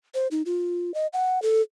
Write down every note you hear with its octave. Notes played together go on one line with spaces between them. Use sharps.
C5
D#4
F4
D#5
F#5
A4